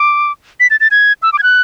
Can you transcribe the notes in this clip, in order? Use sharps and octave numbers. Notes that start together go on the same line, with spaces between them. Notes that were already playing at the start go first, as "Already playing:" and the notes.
Already playing: D6
B6
A6
A6
G#6
E6
D6
G#6
F#6